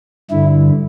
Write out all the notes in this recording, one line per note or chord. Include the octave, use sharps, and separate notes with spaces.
G2 D3 E4